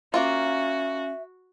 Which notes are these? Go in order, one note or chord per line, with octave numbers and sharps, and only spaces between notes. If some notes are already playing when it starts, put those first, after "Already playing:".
A#3 C#4 F4 F#4 E5